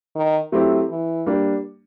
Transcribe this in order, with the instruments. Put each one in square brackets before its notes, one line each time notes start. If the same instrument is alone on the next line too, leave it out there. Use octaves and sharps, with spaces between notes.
[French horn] D#3
[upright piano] F#3 A3 C4 E4 G4
[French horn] E3
[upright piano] G3 A#3 D4 G4